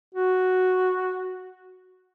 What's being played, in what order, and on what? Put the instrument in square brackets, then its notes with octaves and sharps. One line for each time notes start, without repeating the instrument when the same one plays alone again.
[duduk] F#4